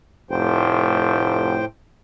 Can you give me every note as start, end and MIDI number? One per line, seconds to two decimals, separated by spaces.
0.31 1.58 29
0.31 1.65 45
0.31 1.65 72
0.31 1.65 79